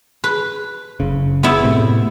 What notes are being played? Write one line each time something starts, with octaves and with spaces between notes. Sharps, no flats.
B4
F#1 C#3
B3 E4
A2 C3